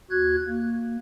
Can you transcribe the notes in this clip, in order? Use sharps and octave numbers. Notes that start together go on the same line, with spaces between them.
D#2 F#4 F#6 G#6
A#3